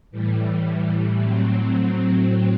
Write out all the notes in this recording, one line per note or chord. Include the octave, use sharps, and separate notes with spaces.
A2 E3 G3
A2 F#3 C4